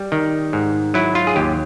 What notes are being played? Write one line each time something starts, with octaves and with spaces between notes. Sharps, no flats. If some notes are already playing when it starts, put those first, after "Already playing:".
Already playing: G3
D#3
G#2
F#3 E4
F4
G#4
D#2 G4